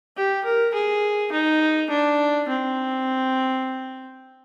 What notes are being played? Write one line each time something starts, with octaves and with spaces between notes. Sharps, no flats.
G4
A#4
G#4
D#4
D4
C4